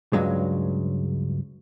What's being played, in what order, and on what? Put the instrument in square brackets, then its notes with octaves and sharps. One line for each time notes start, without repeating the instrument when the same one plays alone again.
[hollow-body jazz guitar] C#2 G2 F#3 G#3